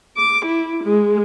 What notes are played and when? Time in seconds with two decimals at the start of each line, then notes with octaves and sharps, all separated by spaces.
0.17 D6
0.46 E4
0.84 G#3